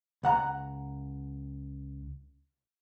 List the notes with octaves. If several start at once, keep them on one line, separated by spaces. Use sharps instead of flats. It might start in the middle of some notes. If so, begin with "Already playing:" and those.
C#2 F#5 A#5